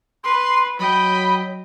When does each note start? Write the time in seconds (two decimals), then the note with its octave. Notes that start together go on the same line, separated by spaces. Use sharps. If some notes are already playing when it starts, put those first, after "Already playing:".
0.24 B4 C6
0.79 F#3 D#5 G5 B5